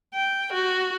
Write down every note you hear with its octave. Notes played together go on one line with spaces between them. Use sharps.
G5
F#4